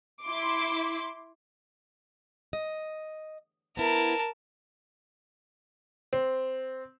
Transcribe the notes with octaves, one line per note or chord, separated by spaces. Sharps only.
E4 C6 D6
D#5
B3 E4 A#4 A5
C4